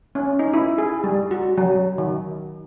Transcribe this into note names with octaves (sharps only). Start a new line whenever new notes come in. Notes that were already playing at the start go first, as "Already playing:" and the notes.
C#4
D#4
E4
G#4
G3
F#4
F#3
D#3